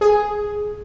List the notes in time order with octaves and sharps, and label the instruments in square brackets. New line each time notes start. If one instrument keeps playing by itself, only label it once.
[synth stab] G#4